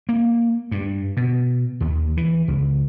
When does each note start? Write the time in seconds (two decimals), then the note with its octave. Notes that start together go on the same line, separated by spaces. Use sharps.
0.09 A#3
0.72 G2
1.17 B2
1.81 D#2
2.17 E3
2.48 C#2